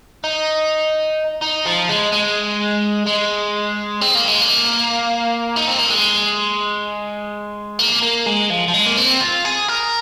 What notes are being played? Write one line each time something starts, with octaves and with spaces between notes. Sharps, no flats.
D#4
D#4
F3
G#3
G#3
G#3
C4
A#3
G#3
A#3
D#4
C4
A#3
G#3
A#3
A#3
G#3
F3
F3
G#3
A#3
C4
F4
G#4
A#4